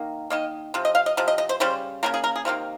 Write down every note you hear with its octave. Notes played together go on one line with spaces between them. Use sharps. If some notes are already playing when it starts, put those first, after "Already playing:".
Already playing: D#3 A#3
D#3 A#3 D#5
C3 F3
D#5
F5
D#5
C3 F3
D#5
D#5
C5
C#3 G3 C5
C#3 G3 A#3 A#4
G#4
A#4
G#4
C3 D#3 A#3 F4